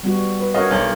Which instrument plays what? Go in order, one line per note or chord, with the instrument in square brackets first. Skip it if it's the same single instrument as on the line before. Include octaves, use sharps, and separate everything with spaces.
[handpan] G3 B3 F#4
B4
[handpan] D4 A#4 C#5 [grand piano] F#4 D#5 F5
[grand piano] B1